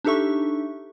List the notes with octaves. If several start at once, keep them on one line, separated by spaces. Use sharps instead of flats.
D4 D#4 G4 A4 E5 C#6